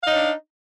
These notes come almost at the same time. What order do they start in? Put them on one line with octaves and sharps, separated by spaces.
F5 D#4 C#5 D4